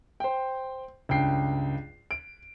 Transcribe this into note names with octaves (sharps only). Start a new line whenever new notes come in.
C5 G5
C#2 G2 G5 C7
D7